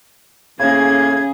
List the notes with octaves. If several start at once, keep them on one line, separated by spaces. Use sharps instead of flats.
A2 C#3 A#3 C#4 G#4 G#6